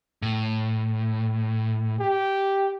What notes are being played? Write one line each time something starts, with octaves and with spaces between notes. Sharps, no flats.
A2
G4